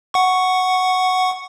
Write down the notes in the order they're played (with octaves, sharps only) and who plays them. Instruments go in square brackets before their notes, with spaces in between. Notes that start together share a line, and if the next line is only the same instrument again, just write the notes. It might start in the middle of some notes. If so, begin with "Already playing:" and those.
[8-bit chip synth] F#5 C#6